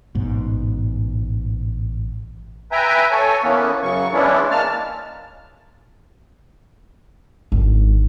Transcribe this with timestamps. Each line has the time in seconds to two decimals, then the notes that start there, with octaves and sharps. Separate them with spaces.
0.15 A1 G#2 B2
2.72 B4 E5 G5 G#5 A#5
3.11 A4 C#5 G#5
3.43 E3 A#3 B3 C#4
3.83 F#2 C#3 F#3 C#6
4.13 E3 G#3 B3 C#4 D4 E4
4.51 G#3 A#3 A5 F6
7.52 G#1 D3